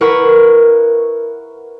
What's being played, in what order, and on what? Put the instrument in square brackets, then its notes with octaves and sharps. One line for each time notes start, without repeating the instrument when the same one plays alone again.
[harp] E4 A#4 B4 F#5 B5 C#6